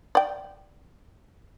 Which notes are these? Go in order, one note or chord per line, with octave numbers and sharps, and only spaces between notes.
D5 G5